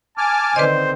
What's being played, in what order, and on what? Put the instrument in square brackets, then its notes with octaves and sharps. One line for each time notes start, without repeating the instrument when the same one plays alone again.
[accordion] G#5 D6 F6 [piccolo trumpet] A5
[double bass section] D3 D#3 C4 [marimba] B4 D5 D#5 [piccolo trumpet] C5